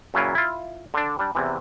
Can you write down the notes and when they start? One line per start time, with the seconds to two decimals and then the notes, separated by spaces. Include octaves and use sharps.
0.14 F#2 A#2 C#3 F#3 E4 F4
0.35 E4 F4
0.94 D3 D4
1.19 G3 D4
1.35 E2 C3 E3